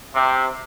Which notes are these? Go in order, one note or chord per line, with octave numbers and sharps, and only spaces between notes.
C3